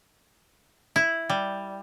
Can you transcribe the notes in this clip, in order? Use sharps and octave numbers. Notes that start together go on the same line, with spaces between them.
E4
G3